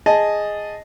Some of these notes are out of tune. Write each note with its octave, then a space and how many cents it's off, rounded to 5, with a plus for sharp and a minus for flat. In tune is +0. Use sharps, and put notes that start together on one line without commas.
G#4 +0 D#5 +0 A5 +0